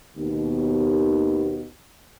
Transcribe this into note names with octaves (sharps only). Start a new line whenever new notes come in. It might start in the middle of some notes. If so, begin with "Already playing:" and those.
D#2 B2